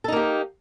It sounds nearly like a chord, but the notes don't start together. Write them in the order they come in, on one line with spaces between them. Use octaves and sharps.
A4 D#4 A#3 G4